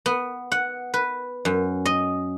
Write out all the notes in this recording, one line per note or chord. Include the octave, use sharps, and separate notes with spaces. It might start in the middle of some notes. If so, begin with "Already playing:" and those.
B3
F#5
B4
F#2
D#5